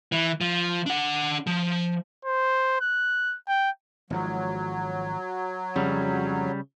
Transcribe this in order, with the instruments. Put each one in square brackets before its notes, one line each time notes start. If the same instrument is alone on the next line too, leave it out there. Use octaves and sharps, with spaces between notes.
[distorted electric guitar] E3
F3
D4 F#5
F3
[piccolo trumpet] C5
F#6
G5
[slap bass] G#1 G#2 F3 [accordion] F#3
[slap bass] F2 [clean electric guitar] C#3 G3